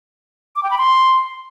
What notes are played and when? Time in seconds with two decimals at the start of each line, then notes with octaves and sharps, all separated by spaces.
0.56 D6
0.63 G5
0.71 B5
0.78 C6